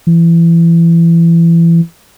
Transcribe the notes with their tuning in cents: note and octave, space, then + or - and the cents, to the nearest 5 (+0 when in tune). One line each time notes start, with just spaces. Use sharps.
E3 +25